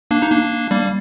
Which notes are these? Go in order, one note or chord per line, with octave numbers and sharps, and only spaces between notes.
A#3 D4
D#4
A#3 D4
G3 A#3